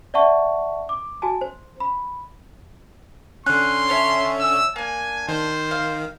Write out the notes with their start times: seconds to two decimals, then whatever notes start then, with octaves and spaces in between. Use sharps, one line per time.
0.14 D5 E5 F#5 A5 C#6
0.89 D6
1.22 F#4 G#5 A5
1.41 C5
1.80 B5
3.46 D3 C#4 C6 F#6
3.89 D4 C#5 E5
4.40 E6
4.76 A#3 D4 G#5
5.28 D#3 C5
5.71 F5